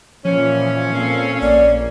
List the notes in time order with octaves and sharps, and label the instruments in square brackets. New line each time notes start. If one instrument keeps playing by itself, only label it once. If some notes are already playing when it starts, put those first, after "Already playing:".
[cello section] A#2 E3 [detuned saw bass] F3 [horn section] C#4
[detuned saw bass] A#2 [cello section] C4 A4 F5
[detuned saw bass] A#1 [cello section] A#3 [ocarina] D5